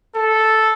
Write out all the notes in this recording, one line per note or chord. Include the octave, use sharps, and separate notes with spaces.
A4